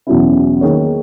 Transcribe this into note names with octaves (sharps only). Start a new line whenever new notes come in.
E2 B2 F#3 C#4 E4
D#3 A#3 D#4 G#4 C#5